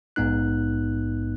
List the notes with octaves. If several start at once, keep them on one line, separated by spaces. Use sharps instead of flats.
A#1 G#2 B3 D#4 F#6